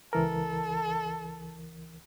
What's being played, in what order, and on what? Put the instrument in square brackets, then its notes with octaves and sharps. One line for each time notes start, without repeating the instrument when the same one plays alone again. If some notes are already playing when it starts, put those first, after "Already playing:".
[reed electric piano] C#2 E3 A#4 [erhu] A4